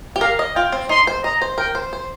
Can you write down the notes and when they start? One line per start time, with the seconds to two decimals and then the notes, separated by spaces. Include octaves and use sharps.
0.16 G4
0.21 A#4 F5
0.39 D#5
0.55 F4 G5
0.72 C4
0.89 D#4 C6
1.07 C5
1.24 D#5 A#5
1.42 C5
1.58 A#4 G5
1.75 C5
1.93 C5